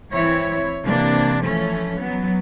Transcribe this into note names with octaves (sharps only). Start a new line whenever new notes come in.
E3 C4 E4 C#5
C3 E3 A#3 D4
E3 F3 A3 C#4
F#3 B3